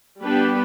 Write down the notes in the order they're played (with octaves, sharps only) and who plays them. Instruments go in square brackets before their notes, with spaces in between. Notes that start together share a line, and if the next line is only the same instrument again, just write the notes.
[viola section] G3 B3 D4 G4 B4